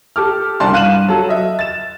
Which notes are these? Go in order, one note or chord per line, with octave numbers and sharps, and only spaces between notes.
G4 A4 D6 F6
C2 D4 D5 A5 C6
G2 F5 F#6 D#7 E7 F#7
F#3 A4
D#5 E5
A6 E7